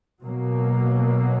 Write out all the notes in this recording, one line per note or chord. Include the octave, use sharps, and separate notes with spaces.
B2 F#3 A#3